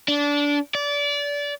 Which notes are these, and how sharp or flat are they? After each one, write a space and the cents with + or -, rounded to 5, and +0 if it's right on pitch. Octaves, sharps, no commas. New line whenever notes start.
D4 -20
D5 -25